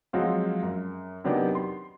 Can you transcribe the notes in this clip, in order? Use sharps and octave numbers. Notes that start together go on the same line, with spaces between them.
F3 F#3 G#3 C4 F4 F#4
F#2
C3 D#3 F#3 B3 D4 G4
C6